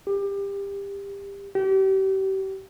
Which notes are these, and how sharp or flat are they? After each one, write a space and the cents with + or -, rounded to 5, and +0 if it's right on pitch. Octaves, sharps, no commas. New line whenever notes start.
G4 +25
G4 -35